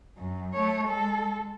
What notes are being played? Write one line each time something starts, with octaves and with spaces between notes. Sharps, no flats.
F#2
A3 C#5
G#3 A4